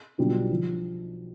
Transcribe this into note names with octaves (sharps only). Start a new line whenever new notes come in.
B1 B2 G3 D4 F4
F3